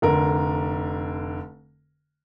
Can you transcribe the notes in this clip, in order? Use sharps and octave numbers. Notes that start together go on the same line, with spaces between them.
F1 D3 A#4